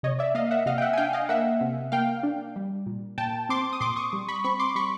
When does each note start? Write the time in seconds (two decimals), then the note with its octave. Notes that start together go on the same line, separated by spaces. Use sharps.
0.03 C3 C#5 D#5
0.19 D5 E5
0.35 A#3 D#5 F5
0.51 E5 F#5
0.66 C3 D#5 F5
0.78 G5
0.82 E5 F#5
0.93 G#5
0.97 D4 F5 G5
1.13 D#5 F5
1.29 A#3 E5 F#5
1.61 C3
1.92 A#3 F5 G5
2.23 D4
2.56 G3
2.86 A#2
3.18 A#2 G5 A5
3.49 C4 C6 D6
3.73 D#6
3.81 A#2 C6 D6
3.96 C#6 D#6
4.13 G3
4.28 B5 C#6
4.44 C4 B5 C#6
4.59 C6 D6
4.75 G3 B5 C#6